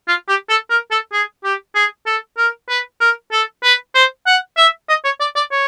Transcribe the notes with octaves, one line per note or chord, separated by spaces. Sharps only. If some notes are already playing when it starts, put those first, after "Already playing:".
F4
G4
A4
A#4
A4
G#4
G4
G#4
A4
A#4
B4
A#4
A4
B4
C5
F#5
E5
D#5
C#5
D5
D5
C#5